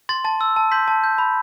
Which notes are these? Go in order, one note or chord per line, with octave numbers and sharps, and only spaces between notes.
C6 A6
A5 A6
E6
A5
C6 G6 B6
A5
G6
B5